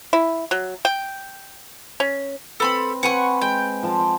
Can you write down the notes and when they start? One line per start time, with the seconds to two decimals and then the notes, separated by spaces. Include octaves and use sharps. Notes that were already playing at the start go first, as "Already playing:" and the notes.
0.13 E4
0.51 F#3
0.85 G5
2.00 C#4
2.60 C4 A4 B4 B5 C6
3.03 C4 B4 F#5 G#5 C#6
3.41 G#3 G5
3.83 F3 C5 A5
3.99 G5